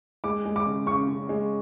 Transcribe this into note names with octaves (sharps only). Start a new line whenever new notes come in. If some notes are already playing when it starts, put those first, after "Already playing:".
G#3 D6
G#3
D6
C#3
C#3 C#6
C#3
G#3